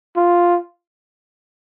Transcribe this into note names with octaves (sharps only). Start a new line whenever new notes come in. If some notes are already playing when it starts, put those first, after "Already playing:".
F4